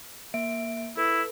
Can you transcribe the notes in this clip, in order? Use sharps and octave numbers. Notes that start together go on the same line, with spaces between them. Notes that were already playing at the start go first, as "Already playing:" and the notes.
A#3 E5 D7
E4 A4 B4